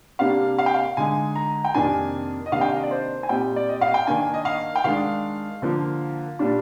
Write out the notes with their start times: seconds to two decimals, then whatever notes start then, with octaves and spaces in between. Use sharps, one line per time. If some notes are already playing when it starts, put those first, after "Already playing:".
0.19 C3 G3 A#3 D4 F5
0.59 F5
0.66 G5
0.74 F5
0.97 D3 G#3 D#4 G#5
1.35 A#5
1.64 G5
1.74 F2 C3 D#3 A#3 D4 G#5
2.46 D#5
2.52 C3 D#3 A#3 D4 F5
2.61 G5
2.69 F5
2.76 D#5
2.83 D5
2.91 C5
3.23 G#5
3.29 A#2 G3 C4 D#4 G5
3.56 D5
3.69 D#5
3.81 F5
3.94 G5
4.07 D#3 A#3 D4 G#5
4.34 D#5
4.45 F5
4.75 G5
4.84 D#3 G#3 D4 F5
5.62 D3 F3 A#3
6.39 A#2 G3 D4